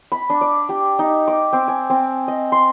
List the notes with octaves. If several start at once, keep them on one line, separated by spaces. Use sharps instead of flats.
B5
D4
D5
G4
D#4
D6
C4
G#5
C4
D#5
C6